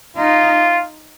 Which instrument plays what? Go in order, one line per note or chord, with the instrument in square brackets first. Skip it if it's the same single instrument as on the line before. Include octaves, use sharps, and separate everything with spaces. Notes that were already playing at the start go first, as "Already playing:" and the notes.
[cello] D#4 [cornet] F4